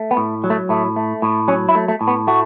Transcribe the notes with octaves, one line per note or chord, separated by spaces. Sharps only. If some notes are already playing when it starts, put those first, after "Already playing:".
Already playing: A3
B3
A2
F#3
A3
A2 A3
A3
A2
F#3 C#4
E4
A3
A3
A2
B3
A3 F#4